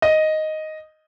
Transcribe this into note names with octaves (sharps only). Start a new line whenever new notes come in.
D#5